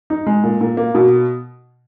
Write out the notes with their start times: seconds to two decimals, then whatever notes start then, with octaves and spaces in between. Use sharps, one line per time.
0.10 D#4
0.27 G#3
0.44 A#2
0.61 A#2
0.77 A#3
0.95 B2